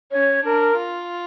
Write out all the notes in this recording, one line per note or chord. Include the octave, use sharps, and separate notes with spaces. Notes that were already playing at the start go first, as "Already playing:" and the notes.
C#4 C#5
D4 A#4
F4